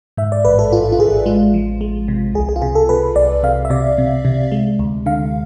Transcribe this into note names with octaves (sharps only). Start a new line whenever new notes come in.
G#2 E5
D5
A1 B4
A4
A1 F4
F4
A1 G#4
G#3 F4
F3
G#3
C3
C2 G#4
G#4
F4
C3 G#4
A4
C3 B4
C2 D5
C3 F5
E5
C3 D5
C3
C3
G#3
D2
D3 F5